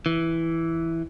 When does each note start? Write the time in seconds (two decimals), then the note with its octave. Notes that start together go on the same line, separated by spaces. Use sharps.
0.06 E3